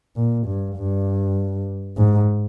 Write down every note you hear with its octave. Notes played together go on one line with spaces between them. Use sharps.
A#2
G2
G2
G#2